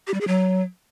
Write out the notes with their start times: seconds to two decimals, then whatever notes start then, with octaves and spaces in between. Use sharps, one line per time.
0.07 G4
0.14 G3
0.21 G#4
0.27 F#3